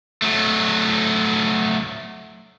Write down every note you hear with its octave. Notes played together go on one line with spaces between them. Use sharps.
F#3 A3